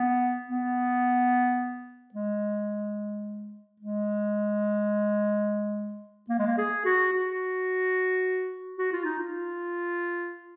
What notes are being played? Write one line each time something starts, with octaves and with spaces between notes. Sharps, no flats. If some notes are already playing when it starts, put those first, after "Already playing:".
Already playing: B3
B3
G#3
G#3
A#3
G#3
A#3
G#4
F#4
F#4
F#4
F4
D#4
F4